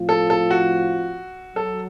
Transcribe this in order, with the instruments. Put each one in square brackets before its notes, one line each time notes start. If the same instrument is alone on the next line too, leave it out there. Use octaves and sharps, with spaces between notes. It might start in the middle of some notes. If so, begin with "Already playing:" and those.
Already playing: [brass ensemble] A2 F3 C4 F4
[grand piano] A4
A4
F#4
[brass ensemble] F#3 [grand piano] A4